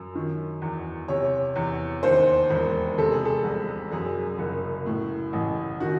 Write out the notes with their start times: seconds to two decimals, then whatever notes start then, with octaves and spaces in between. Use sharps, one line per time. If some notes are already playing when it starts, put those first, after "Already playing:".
Already playing: F#2
0.15 D#3
0.62 E2
1.08 C3 C#5
1.56 E2
2.03 D#2 C5
2.50 E1
2.98 C3 A4
3.12 G#4
3.25 A4
3.44 C2
3.91 F#2 G#4
4.39 F#1
4.86 A2
5.33 A1
5.80 D#3 F#4